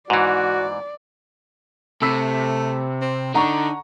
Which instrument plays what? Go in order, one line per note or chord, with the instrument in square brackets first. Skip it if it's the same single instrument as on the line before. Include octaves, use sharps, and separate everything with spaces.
[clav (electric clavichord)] G#2 E3 [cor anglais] F#4 [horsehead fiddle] D5
[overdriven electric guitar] C3 [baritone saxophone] A3 [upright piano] B5 E6 B6
[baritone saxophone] C4
[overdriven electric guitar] D3 [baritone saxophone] D#4 [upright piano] F#5 A#5 C#6